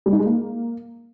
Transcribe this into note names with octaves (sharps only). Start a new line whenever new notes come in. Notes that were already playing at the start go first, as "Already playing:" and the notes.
G3
D#4
G#3
A#3